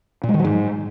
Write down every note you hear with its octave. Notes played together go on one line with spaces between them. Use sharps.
A#2
G#3
D#3
F#3
G#2